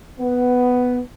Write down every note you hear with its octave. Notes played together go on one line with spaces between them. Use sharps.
B3